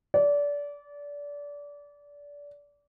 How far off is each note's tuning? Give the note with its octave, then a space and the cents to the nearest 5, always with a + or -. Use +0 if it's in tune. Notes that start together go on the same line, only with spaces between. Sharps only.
D5 -25